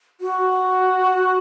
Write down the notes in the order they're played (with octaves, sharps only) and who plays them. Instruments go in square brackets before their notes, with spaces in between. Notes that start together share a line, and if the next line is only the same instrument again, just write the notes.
[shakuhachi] F#4